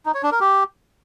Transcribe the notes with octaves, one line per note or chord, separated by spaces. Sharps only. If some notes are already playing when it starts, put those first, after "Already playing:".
D#4
C#5
D4
A#4
G4